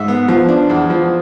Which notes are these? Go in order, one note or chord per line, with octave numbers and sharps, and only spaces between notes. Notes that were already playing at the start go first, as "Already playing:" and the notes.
Already playing: G#2 E5
B3
F3
D4
E2
F3